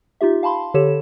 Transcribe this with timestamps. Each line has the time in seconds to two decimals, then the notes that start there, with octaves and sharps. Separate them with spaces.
0.21 D#4 F4 G4 E5
0.43 F5 A5 B5 C6
0.74 D3 G4 A4 C#5 E7